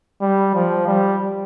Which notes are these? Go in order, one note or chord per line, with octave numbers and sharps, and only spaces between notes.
G3
F3
G3